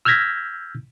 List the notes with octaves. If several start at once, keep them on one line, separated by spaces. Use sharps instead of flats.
E6 F6 G6 G#6 A#6 B6